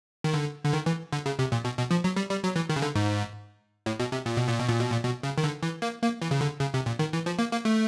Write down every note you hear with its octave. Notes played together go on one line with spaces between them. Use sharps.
D#3
D3
D3
D#3
E3
D3
C#3
C3
A#2
B2
B2
F3
F#3
G3
G3
F#3
E3
D#3
C#3
D3
G#2
A2
B2
C3
A#2
B2
A#2
B2
A#2
B2
A#2
B2
C#3
D#3
D3
E3
A#3
A#3
E3
C#3
D3
C#3
C3
A#2
D#3
E3
F3
A#3
A#3
A3